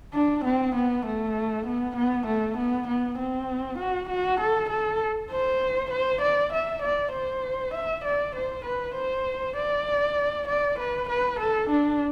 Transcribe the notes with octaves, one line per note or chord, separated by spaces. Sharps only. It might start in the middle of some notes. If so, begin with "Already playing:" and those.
D4
C4
B3
A3
B3
B3
A3
B3
B3
C4
F#4
F#4
A4
A4
C5
C5
D5
E5
D5
C5
E5
D5
C5
B4
C5
D5
D5
B4
B4
A4
D4